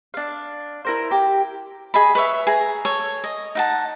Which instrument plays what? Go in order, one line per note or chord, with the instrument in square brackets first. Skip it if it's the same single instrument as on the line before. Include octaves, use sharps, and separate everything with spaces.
[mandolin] D4 F5
E4 A#4 C5
G4
[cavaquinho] G#4 D#5 B5
B4 C#5 E5
G#4 A#5
A4 C#5
D#5
D#4 F#5 A5